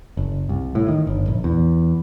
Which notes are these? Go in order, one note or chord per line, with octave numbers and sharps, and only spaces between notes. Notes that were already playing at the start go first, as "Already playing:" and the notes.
F#1
C2
A2
D#3
G1
A#1
E2